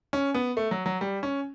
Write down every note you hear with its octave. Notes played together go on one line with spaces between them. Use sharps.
C#4
B3
A3
F#3
F#3
G3
C#4